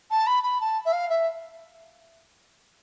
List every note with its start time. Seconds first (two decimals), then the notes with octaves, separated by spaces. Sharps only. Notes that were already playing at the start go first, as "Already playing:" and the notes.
0.10 A5
0.26 B5
0.43 B5
0.60 A5
0.85 E5
0.92 F5
1.09 E5